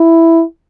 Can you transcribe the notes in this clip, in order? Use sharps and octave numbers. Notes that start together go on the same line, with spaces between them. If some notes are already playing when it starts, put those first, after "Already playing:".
Already playing: E4